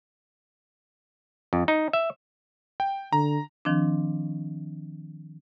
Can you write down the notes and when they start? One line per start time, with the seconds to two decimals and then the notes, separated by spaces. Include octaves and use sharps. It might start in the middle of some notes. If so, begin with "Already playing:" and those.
1.53 F2
1.68 D#4
1.93 E5
2.80 G5
3.13 D3 A#5
3.65 D#3 F3 C4 D4